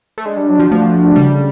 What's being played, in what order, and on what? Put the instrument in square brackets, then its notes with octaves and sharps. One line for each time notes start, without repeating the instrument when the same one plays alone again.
[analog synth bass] A3
[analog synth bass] G#3 [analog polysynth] D4
[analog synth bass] G3
[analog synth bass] F#3 [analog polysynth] F#4
[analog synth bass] F3
[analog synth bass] F3 [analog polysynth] A3
[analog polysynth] D4
[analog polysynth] C#3 [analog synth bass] G3